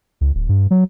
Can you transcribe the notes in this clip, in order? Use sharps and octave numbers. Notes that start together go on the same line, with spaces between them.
C#2
D1
G2
F#3